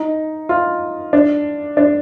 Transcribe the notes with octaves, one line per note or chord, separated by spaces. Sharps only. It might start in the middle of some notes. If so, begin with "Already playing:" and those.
Already playing: D#4
F4
D4
D4